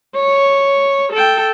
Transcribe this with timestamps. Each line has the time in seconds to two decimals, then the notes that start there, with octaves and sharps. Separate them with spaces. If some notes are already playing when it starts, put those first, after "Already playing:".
0.16 C#5
1.13 A4 G5